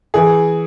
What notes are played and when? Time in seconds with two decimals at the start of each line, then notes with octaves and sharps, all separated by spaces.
0.14 E3 G#4